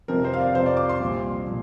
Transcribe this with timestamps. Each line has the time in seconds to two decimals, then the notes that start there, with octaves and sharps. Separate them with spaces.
0.08 F2 C3 F3 A#4
0.25 C5
0.34 F5
0.39 D5
0.54 F2 C3 F3 C5
0.66 D5
0.77 D6
0.89 C6
1.00 C2 A#2 F3
1.47 A#2 F3